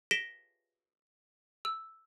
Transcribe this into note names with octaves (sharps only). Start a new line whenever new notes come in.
A#6 B6 D7 E7 G7
E6